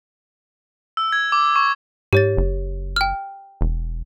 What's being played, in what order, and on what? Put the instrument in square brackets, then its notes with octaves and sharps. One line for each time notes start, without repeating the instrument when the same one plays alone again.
[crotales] E6
G#6
D6
C#6
[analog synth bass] G#2 [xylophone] G4 C#5 A6
[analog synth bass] F#1
[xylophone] G5 F6
[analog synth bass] E1